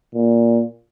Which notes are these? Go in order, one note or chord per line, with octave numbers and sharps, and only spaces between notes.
A#2